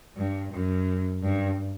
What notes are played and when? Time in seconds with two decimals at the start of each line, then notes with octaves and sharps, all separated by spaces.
0.17 G2
0.52 F#2
1.23 G2